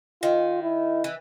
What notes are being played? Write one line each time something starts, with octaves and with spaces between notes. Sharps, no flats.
D#3 F4
E4
E3